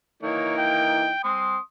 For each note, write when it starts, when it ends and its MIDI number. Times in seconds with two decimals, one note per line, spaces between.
0.23 1.10 52
0.23 1.10 58
0.23 1.10 63
0.23 0.55 73
0.58 1.24 79
1.24 1.57 60
1.24 1.58 84
1.24 1.58 87